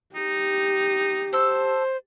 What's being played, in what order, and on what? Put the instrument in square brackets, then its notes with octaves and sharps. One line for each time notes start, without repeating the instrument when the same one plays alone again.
[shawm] D#4 [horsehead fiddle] G4
[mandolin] A4 E6 [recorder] C5